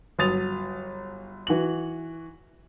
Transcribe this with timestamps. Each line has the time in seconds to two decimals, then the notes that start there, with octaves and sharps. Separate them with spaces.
0.19 G1 F#3 D#6 A6 F7
1.47 E3 F#4 F#7